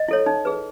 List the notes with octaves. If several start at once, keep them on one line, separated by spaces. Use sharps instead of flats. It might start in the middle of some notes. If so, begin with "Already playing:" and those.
Already playing: D#5
E4 A4 C#5
D#4
G#4 B4